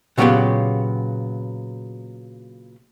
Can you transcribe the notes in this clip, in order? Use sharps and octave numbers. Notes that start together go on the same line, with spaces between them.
A#2 C#3 F#3 B3 F4 G4